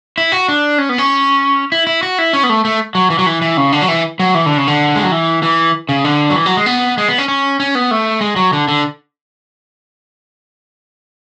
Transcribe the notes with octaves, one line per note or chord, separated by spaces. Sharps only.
E4
F#4
D4
C#4
B3
C#4
E4
E4
F#4
E4
C#4
B3
A3
A3
F#3
E3
F#3
E3
E3
C#3
D3
F#3
E3
F#3
E3
D3
C#3
D3
G#3
F#3
E3
E3
C#3
D3
F#3
E3
F#3
G#3
B3
G#3
B3
C#4
C#4
C#4
B3
A3
G#3
F#3
D3
D3